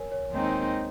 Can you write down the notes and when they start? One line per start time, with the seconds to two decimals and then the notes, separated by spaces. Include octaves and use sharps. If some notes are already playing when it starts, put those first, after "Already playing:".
Already playing: A#4 C#5 G#5
0.12 C#5
0.32 D#2 D#3 G#3 C4 D#4